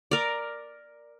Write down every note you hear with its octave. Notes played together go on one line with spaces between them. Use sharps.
A#4 D5